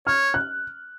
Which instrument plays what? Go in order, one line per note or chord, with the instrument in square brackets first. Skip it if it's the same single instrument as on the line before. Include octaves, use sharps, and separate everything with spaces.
[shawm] C#5 [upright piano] F6
[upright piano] F#6